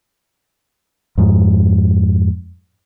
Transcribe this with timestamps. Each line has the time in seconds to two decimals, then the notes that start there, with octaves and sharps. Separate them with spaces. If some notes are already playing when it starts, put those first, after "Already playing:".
1.18 F2 G#2